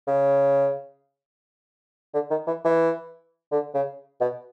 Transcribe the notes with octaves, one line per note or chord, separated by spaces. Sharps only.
C#3
D3
D#3
E3
E3
D3
C#3
B2